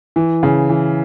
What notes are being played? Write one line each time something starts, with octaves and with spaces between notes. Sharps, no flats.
E3
C#3
E3